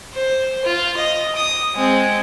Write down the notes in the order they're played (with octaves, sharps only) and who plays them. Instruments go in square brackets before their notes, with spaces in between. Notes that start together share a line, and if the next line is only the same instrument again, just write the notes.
[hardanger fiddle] C5
F4
D#5
D#6
G#3 C4